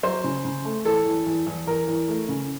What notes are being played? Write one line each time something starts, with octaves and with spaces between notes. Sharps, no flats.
F#3 C5
C#3
C#3
A3
E2 A4
E2
E2
E2
E2 A#4
E2
A3
C#3